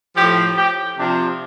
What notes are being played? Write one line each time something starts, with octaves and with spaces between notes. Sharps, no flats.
A2 F3 G4
G4
C3 F3 D4